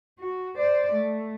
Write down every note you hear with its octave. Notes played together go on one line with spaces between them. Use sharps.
F#4
C5 D5
A3